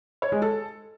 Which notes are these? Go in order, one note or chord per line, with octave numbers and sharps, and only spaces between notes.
C#5
G#3
A4